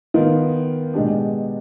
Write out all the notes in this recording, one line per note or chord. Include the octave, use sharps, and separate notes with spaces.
D#3 B3 F4
B2 G#3 D4 G4